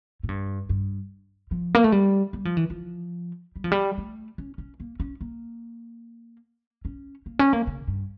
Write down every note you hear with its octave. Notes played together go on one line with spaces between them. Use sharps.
A2
G2
G2
F3
A#3
A3
G3
G3
F3
E3
F3
G3
F3
G3
A3
C#4
C#4
A#3
C#4
A#3
C#4
A#3
C#4
A#3
C#3
G2